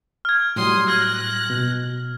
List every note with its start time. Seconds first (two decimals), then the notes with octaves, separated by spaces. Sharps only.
0.25 F6 G#6
0.56 A2 F#3 G3 C6 D#6
0.88 F6 F#6 G#6 A#6
1.50 B2